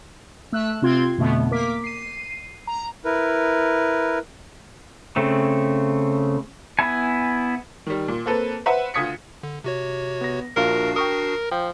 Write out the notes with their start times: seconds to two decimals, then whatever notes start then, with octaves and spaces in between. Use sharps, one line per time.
0.52 A3 E6 F#6
0.82 C3 C4 F4 C6 G#6
1.17 F2 B2 D3 A3 B3
1.51 A#3 A#4 D6 B6
1.84 C7 D#7
2.67 A#5
3.05 E4 A#4 B4
5.16 C#3 A3 C4
6.79 B3 E4 G#5
7.86 D#3 G3
8.08 A#2
8.26 A#3 C4 A4 B4
8.66 B4 C5 E5 F#5
8.94 D2 F4 D#6 G#6 B6 C#7
9.43 D3
9.64 C3 F#4 C#5
10.21 B3 A#6
10.56 A#1 D4 F4 F#4 A#4 F5 C7
10.96 A#4 G5 C#6 D#6
11.51 F3 G5